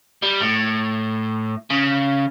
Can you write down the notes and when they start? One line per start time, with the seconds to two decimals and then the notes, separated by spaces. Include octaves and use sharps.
0.23 G3
0.42 A2
1.71 C#3